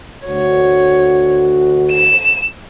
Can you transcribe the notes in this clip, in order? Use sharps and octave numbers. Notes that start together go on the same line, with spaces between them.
D2 F#4 C#5
E7